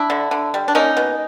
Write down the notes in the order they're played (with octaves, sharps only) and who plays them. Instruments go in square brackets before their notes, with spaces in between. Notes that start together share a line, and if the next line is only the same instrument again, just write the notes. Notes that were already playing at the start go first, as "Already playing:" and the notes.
Already playing: [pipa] D4 E4
D3
D3
G3
D4
A#3 C#4 D#4
B2